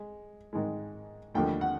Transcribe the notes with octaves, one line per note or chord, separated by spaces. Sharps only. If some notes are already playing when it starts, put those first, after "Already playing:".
Already playing: G#3
G#2 D#3 G#3
D#2 D3 F3 A3 G5
F#5